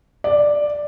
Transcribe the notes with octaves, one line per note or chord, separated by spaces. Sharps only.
D5